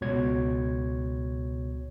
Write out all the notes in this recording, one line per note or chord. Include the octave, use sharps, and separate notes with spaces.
C#2 B2 C#5 G#6